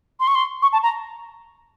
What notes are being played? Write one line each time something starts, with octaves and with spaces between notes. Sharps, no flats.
C6
C#6
C6
C#6
A5
A#5